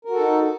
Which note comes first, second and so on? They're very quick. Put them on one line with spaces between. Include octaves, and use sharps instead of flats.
A#4 F#4 A4 D#4